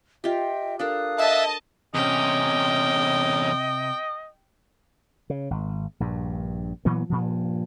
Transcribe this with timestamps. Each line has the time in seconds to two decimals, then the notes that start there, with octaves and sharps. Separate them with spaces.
0.24 F4 G4 D#5 E5 G5
0.79 D4 A4 A#4 F5 D#6 F#6
1.18 D#5 E5 A5
1.94 E2 C3 C#4 D#5 G5
5.30 C#3
5.51 G#1
6.00 A#1 G2
6.85 A#2 E3 F#3 B3
7.10 G2 A#2 F3